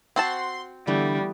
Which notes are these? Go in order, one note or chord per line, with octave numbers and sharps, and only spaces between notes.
C4 F#4 F#5 A5 C6
D3 E3 G3 A3 B3